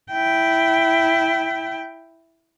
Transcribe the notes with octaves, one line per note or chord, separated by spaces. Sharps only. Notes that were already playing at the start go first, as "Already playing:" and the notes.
E4 G5